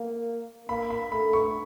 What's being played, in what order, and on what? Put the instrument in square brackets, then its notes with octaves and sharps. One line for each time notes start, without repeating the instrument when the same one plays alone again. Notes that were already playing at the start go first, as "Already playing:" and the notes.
Already playing: [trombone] A#3
[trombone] A#3 [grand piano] B5
[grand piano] B5
[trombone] A3 [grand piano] B5
[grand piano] C#6